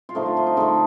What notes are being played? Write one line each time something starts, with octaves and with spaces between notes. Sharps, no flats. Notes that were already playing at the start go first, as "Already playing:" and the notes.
F4
D3 F3 A3 D#4
F4
F4
D#4
D3 A3 D#4